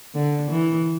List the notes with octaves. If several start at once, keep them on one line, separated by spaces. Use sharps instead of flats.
D3
E3